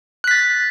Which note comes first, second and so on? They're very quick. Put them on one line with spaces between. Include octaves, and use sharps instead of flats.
F#6 B6 A6